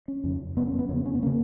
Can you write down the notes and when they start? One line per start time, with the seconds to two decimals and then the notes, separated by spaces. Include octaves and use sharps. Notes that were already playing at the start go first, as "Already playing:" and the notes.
0.08 C#4
0.24 F2 C#3
0.56 F#2 C#3 B3
0.67 C#4
0.79 B3
0.89 F2 C#3 C#4
1.06 C#4
1.15 B3
1.23 A#3
1.27 C#3